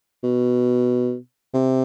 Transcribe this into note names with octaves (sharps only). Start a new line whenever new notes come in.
B2
C3